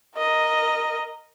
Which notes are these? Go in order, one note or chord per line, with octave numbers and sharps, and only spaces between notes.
A#4 D#5